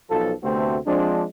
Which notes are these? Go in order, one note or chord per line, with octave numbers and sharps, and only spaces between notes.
B1 F3 A4
D2 C3 A3 B3 C4 F#4
F3 G#3 C4 D4